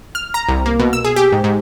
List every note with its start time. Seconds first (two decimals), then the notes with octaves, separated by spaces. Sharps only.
0.15 F6
0.34 A#5
0.49 C2
0.66 A#3
0.79 B2
0.93 E6
1.05 G#4
1.16 G4
1.32 G#2
1.44 G#2